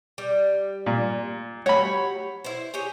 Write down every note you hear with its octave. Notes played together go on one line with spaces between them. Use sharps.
G3
A#2
F#4 G4 C#5 F#5 B5
E4 C5
G4 G#4 C#5